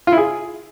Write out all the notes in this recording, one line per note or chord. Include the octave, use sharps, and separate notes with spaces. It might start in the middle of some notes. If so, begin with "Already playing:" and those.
F4
E4
G#4